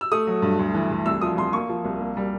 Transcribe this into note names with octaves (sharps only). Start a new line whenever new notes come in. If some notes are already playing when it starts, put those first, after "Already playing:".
E6
A3 D#6
F#3
G2
D2
E3
D2
C2 E6
F3 D#6
C2 C6
A#3 C#6
F3
C2
A#3
G3